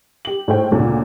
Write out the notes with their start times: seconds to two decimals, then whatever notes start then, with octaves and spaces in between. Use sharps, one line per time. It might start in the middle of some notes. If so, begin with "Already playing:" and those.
0.25 G4 F#7
0.48 A2 G#3 C5 G5
0.71 D2 A#2 C#3